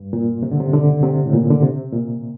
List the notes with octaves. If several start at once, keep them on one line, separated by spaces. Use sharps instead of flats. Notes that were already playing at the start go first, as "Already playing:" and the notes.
Already playing: G2
A#2
C3
D3
C3
D3
C3
A2
A#2
D3
C3
A#2